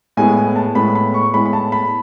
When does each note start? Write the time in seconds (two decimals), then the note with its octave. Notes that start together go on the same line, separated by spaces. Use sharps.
0.17 A2 G#3 B3 G#5
0.37 G#5
0.56 A5
0.75 A2 G#3 B3 B5
0.95 B5
1.14 C#6
1.34 A2 G#3 B3 B5
1.46 B5
1.53 A5
1.72 B5